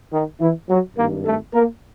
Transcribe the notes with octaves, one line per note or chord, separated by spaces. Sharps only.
D#3 D#4
E3 E4
F#3 F#4
G#1 G2 D#3 A#3 A#4
A3 A4
A#3 A#4